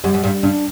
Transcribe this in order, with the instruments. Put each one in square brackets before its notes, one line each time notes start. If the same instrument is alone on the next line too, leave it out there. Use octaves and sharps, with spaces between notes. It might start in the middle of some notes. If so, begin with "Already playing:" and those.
[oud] F#2 [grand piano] G3
[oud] F#2
[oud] G2 [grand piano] G3
[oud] G2 [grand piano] D4